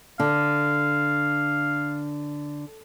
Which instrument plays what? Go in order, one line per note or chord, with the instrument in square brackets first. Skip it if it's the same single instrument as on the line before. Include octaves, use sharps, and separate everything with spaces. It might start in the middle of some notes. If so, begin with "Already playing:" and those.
[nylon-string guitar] D3 [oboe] F5